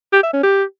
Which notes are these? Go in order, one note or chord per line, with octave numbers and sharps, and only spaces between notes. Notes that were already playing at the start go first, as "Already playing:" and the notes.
G4
E5
C#4
G4